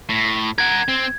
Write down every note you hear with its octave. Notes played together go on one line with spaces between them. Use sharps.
A2
A#4 F#5 G#6
C4